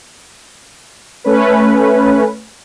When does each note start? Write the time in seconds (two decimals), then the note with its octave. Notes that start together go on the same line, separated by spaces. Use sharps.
1.24 A3 C#4 B4